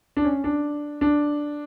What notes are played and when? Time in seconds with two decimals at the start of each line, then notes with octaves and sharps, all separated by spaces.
0.17 D4
0.25 C#4
0.44 D4
1.01 D4